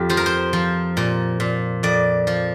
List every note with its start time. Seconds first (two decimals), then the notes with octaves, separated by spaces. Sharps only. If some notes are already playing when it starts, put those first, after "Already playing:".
Already playing: F2 F4 G4
0.10 F3 C5
0.17 A#4
0.26 C5
0.53 F3
0.97 A#2
1.40 A#2
1.83 F2 D5
2.27 F3